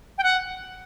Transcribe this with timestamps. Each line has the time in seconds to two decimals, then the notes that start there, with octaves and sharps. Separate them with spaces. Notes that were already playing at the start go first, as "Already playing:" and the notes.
0.18 G5
0.23 F#5